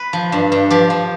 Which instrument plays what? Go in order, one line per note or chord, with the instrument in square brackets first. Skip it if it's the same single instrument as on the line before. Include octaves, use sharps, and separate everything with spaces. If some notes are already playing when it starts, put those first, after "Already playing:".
Already playing: [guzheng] B4
F3
G2
G2
F3 G4
F3